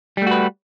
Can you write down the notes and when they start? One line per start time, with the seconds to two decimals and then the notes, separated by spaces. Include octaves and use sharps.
0.17 G3
0.22 A3
0.26 F#4
0.31 B4